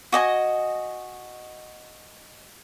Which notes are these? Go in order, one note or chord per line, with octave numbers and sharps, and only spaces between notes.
F#4 D#5 G#5